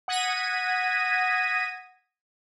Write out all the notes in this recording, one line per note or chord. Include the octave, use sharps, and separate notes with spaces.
F#5 D#6 G#6 A#6 B6 D#7